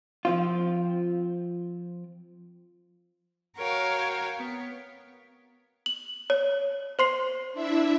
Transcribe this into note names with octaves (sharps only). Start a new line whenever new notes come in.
F3 C4 F4
F#4 A#4 C#5 F5 G5
B3
F#7
C#5
C5 C6 C7
D4 E4 E5